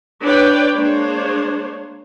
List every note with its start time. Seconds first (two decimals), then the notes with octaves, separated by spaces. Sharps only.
0.23 D4 B4 C#5 D5 G5
0.75 G#3 A#3 D4 C5 C#5